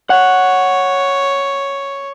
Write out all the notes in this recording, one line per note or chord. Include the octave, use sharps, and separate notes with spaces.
C#5 F#5